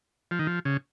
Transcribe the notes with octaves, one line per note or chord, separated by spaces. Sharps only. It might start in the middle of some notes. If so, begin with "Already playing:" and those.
F3
D#3
F3
C#3